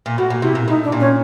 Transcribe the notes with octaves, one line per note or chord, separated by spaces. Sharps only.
A#2
A2 F#4
A#2
C3 E4
A#2
A2 D#4
D4
A#2
C#4